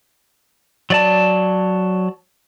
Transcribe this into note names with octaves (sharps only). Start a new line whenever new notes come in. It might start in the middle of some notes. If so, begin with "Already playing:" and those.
F#3 D5 A5